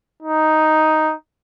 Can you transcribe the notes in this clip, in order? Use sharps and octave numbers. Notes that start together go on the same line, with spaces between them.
D#4